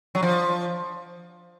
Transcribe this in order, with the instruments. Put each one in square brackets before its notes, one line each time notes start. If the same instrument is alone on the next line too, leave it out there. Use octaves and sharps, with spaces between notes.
[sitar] F#3
F3